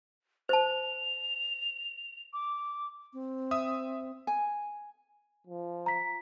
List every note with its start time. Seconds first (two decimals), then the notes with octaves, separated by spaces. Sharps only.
0.49 C5 A5 F7
2.33 D6
3.13 C4
3.51 E5 D#6
4.27 G#5
5.47 F3
5.86 A#5 B6